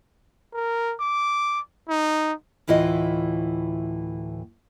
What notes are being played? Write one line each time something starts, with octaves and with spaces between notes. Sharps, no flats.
A#4
D6
D#4
D2 A2 E3 F4 D#5